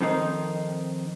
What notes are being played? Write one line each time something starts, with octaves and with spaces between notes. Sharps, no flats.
F2 D#3 C4 D#4